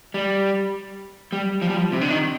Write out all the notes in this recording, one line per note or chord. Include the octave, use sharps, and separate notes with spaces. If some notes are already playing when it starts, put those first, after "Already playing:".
G3
G3
F3
G3
F3
C3
D3
D#3